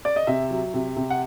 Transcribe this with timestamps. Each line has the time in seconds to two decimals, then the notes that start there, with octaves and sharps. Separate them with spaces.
0.05 D5
0.16 D#5
0.27 C3 E5
0.50 F#3
0.74 C3
0.96 C3
1.10 F#5